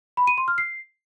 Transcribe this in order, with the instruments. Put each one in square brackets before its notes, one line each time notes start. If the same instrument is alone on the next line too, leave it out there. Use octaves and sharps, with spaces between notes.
[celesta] B5
D#7
C6
F6
C7